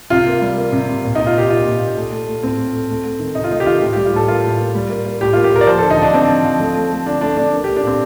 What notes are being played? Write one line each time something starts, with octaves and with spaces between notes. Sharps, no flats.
C3 F4
A#3
G3
A#3
C3
C3
A#2
D#4
A#2
F4
A#2 G4
A#2 F4
A#2
A#2
A3
A3
A3
A2 C4
A3
A3
A3
A3
D#3
C3 D#4
F4
A3 D#4
G4
D#3 F4
A2 G4
G4
G3
F4
A2 A4
A#3 F4
A2
A#3
G3
A#3
A#3
A2 G4
A#3 F4
G4
A#3 A#4
D5
F3 C5
A4
D3
D#4
F3 D4
D3 C4
F3
F3
A3
A3
A3
D3 D4
A3 D4
A3 D4
A#3
G4
A#3
D4
A#2 C4